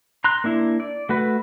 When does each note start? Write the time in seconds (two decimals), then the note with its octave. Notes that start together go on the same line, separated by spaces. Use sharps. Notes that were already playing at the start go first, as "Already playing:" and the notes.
0.24 A#5 C6 F#6
0.44 A#3 D4 E4
0.80 D5
1.09 A3 F#4 B4